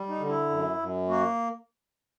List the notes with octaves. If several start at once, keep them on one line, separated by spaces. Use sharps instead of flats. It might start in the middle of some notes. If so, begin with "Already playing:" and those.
Already playing: G3
D#4
D3
E4
F#2
F#2
A#3 F#4